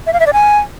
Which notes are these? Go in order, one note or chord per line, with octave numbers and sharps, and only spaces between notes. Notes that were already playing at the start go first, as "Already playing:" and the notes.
E5
F5
E5
D5
G#5